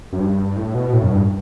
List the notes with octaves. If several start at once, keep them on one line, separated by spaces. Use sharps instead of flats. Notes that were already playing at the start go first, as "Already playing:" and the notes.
F#2
G2
A2
B2
A2
F#2
G2